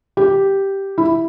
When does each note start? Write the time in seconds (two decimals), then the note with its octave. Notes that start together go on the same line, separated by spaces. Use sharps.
0.17 G4
0.98 E4